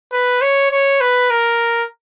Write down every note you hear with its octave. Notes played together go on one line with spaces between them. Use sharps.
B4
C#5
C#5
B4
A#4